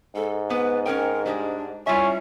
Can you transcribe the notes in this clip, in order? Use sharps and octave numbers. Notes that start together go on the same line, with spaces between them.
G#2 A4
B3 B4
C#4 A#4 G5
G3 G#3 D4
G3 C#4 E4 F4 E5